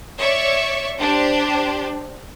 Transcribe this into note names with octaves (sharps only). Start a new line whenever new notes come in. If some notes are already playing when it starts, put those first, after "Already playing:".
C#5 D5 E5 C#6
D4 G4 C5